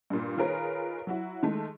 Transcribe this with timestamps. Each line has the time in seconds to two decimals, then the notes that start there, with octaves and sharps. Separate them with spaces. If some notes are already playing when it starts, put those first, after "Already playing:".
0.10 G2 A#2
0.37 D#3 F4 G#4 A#4 B4 C#5
1.07 F#3 E4 F#4
1.43 D#3 G#3 A3 A4